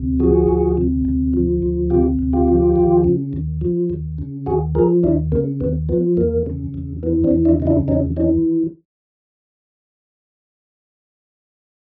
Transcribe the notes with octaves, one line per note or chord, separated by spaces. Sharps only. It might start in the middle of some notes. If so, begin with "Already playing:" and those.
Already playing: D2 C3
F3 F#4 G#4
D2
C3
D2
F3
D2
C3 F4 G4
D2
F4 G4
F3
D#2
C#3
D#2
F3
D#2
C#3
D#2 F#4 G#4
F3 G#4 A#4
D#2 D4 E4
C#3 A#3
D#2 B3
F3 B3
E2 A#3
C#3
E2
E3 B3
C4 D4
E2
D4 E4
C#3 D#4
D4 E4
E2 C#4 D#4
E3 C#4 D#4